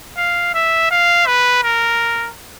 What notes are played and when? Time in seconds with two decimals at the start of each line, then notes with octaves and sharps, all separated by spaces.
0.17 F5
0.54 E5
0.91 F5
1.27 B4
1.64 A#4